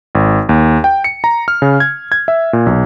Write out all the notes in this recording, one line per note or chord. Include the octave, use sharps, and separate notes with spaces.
G#1
D#2
G5
C#7
A#5
F6
C#3
G#6
G#6
E5
A#2
B1